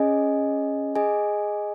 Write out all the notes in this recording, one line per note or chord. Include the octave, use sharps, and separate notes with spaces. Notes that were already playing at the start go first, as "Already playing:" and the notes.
Already playing: C#4 G#4 D#5 G#5
G#4 D#5 G#5